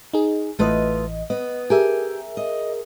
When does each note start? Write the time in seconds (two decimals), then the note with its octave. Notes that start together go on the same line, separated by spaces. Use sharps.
0.13 D#4 G#4
0.59 A1 E3 A3 F4 B4 D#5
1.30 B3 D#5
1.70 G4 G#4 A#4 E5 G#5
2.37 D#5